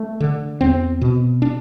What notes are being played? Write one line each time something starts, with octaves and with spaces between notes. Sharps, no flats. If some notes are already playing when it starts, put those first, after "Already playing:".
Already playing: A3
D3
E2 C4
B2
D4